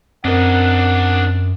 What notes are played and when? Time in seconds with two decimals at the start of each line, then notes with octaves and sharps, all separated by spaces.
0.25 F#2 C4 D4 A#4 D#5 F#5